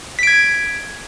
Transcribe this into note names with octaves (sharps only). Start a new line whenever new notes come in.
G#6 B6 D7